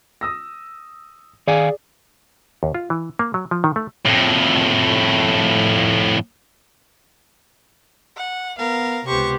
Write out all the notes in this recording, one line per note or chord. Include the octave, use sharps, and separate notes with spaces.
D#6 E6 A#6
D#3 G#4 D5 F5 G#5
D#2
F4
E3
A#3
F#3
F3
D#3
A3
F2 A2
F#5
B3 A#4 F5
C#2 C3 B3 G4 C5 C#6